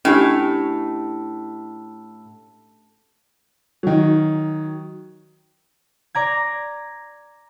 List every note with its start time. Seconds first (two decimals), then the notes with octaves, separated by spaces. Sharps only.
0.05 A2 C#4 D4 G4
3.83 D#3 F#3
6.15 D5 A#5 G#6